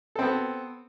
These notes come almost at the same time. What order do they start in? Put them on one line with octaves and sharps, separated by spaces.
A4 C4 B3